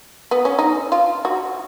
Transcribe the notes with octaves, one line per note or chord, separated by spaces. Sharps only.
B3
C#4
D#4
F4
F#4